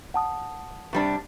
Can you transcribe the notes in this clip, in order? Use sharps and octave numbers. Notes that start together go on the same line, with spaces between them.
F#5 A5 D#6
C3 G3 D4